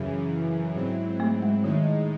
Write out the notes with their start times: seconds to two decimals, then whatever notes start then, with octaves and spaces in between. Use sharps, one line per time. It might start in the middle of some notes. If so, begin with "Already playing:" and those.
Already playing: F#2 C#3 E3 F#3
0.74 G#2 F#3 C4 E4
1.20 A3
1.43 G#3
1.64 A2 D#3 G#3 D#4